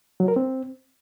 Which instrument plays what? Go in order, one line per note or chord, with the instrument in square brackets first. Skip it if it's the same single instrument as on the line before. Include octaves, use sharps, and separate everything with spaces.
[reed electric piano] F#3
A#4
C4